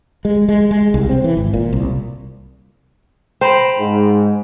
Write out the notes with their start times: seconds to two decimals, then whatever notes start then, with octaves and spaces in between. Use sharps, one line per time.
0.25 G#3
0.49 G#3
0.71 G#3
0.94 C2
1.09 C4
1.24 E3
1.37 G#1
1.53 A#2
1.73 C2
3.41 C5 G5 A#5 B5
3.79 G#2